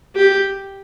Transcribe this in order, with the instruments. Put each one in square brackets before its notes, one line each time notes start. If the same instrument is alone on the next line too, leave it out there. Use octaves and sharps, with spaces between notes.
[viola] G4